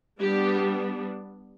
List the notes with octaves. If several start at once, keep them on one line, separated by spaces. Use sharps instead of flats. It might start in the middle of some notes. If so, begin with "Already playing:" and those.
G3 B3 D4 G4